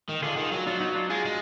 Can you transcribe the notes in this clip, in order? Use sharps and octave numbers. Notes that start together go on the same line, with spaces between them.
D#3
D3 F4 G#4
D#3
F#3
F#3 D4 F4
B3 D#4
D4 F4
G#3 F4 G#4
G#3